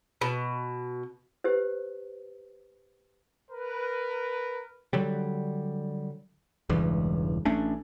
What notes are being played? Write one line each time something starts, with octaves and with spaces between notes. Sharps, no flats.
B2
G4 B4 C5
A#4 B4
D3 F#3 G3
E1 C#2 G2 E3
A1 A3 C#4 D4